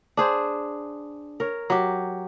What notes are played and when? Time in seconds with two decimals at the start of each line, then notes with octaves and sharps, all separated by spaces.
0.17 D4 G#4 C5
1.40 A#4 C#5
1.70 F#3 G4